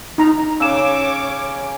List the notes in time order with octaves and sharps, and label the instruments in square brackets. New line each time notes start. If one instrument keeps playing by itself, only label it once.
[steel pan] D#4 A#5
[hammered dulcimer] C#3 [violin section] C#5 D6 [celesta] E6 E7